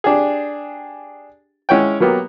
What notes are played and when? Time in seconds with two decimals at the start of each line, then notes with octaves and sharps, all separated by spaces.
0.04 D4 G4 G#4
1.69 G#3 C#4 E4 C#5 F#5 G5
2.00 F#3 A#3 B3 G4